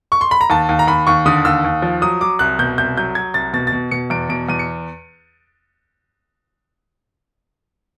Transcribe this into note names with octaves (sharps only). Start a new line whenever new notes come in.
C#6
C6
B5
A#5
D#2 A5
D#2
A#5
D#2 B5
D#2 C#6
D3 D#6
D#2 E6
D#2
F3
F#3 D#6
F#3 D6
C2 F#6
B2 G6
C2 G6
F#3 G6
F#3 G#6
C2 A6
B2 A6
A6
B2
B2 C#7
E2 D7
B2 D7
E2 D#7
C#7